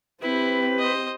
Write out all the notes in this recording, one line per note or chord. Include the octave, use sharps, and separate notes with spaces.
C4 E4 G4 B4
C5 D#5